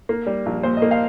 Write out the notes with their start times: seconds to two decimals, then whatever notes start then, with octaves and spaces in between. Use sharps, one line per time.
0.09 A#3
0.27 G3
0.46 A#1
0.63 A#2 C5
0.77 D#5
0.82 A#3
0.91 F5